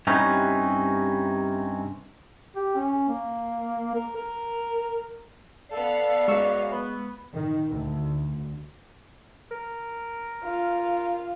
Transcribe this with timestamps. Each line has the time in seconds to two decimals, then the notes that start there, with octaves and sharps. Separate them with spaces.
0.07 G2 C3 C#4 D#4 E4 B4
2.56 G4
2.75 C#4
3.08 A#3
3.95 A#4
4.16 A#4
5.72 B3 A4 D5 F5 C7
6.28 F#2 G#3 C#6 E6
6.72 B3
7.34 D#3
7.69 D2
9.51 A#4
10.44 F4